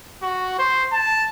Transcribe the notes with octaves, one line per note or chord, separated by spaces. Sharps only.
F#4
C5
A5